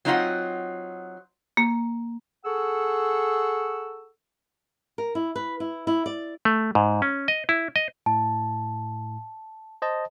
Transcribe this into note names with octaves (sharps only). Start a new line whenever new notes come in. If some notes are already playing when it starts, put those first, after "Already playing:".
F#3 C4 D#4 F4 D#5 F#5
A#3
G#4 A4 F#5 C#6 E6
A#4
E4
B4
E4
E4
D5
A3
G#2
C#4
D#5
E4
D#5
A2 A5
C5 D#5 A5